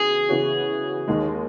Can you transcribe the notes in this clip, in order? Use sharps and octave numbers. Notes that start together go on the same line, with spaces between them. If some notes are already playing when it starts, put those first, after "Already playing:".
Already playing: C#3 E3 B3 F#4 G#4
C#3 E3 B3 F#4 C#5
D#2 D#3 G#3 D#4